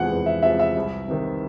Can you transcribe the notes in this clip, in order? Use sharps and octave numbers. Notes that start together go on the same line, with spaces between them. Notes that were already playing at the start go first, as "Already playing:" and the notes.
Already playing: E2 C3 F3 G#3 F#5
E2
E5
C3 F3 G#3 E5
E5
C2
C3 D#3